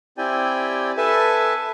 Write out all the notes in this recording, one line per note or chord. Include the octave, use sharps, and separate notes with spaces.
C4 E4 G4 D5 G5 G#5
A4 B4 E5 G#5 A5